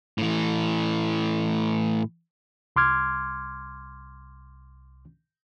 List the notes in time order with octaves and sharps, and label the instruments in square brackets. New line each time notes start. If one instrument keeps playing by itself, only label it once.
[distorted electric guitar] A2 E3
[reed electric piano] C2 C6 D6 F6 G#6